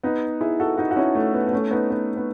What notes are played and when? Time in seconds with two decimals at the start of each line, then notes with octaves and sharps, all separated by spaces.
0.03 B3 D#4
0.41 E4 G#4
0.60 F#4 A4
0.78 D#4 F#4
0.91 F#4
0.96 C#4 E4
1.15 A3
1.34 B3
1.47 B3
1.53 A3 C#4
1.71 B3 D#4
1.90 B3
2.16 B3